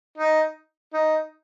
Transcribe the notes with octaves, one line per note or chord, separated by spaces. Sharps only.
D#4
D#4